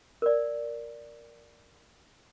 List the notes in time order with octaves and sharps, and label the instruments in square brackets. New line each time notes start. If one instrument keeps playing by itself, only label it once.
[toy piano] A#4 D5